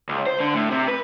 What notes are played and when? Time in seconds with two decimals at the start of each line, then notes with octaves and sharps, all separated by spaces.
0.09 C#2
0.26 C5
0.40 D3
0.54 A2
0.71 C3
0.88 B4